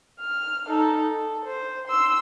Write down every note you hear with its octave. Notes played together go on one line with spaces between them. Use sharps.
F6
D#4 A4
A4
C5
C6 E6